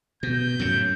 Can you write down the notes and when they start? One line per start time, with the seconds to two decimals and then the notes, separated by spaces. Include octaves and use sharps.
0.23 B2 G6
0.59 F#2 A2 C#3